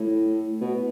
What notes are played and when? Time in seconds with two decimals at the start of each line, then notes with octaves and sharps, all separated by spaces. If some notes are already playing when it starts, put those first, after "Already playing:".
Already playing: A2
0.61 B2